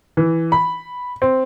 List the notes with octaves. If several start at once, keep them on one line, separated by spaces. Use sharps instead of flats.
E3
B5
C4